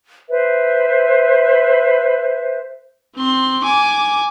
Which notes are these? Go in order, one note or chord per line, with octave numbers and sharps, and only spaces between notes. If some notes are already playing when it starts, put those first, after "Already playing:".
B4 C5 E5
C4 C6
G#5 D6